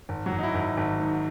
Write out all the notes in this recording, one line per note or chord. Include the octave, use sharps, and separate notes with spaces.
G#1
F#3 F#4
G#1
D#4
E4
G#1
E4
G#1
G#2